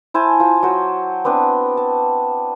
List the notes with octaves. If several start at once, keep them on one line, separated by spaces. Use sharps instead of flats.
E4 C5 G#5 A5
F4 C5
F#3 F#4 C5
B3 C4 D4 B4
A5